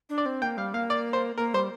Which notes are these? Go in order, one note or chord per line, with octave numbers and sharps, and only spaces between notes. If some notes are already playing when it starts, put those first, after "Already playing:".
D4
D5
C4
A#3 G5
G3 F5
A#3 F5
D5
C5
A#3 A#4
G3 C5